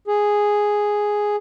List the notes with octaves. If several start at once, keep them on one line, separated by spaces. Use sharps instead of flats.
G#4